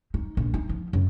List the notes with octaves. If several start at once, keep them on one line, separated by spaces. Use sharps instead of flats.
D#4
A#1
D#4
F3
F#2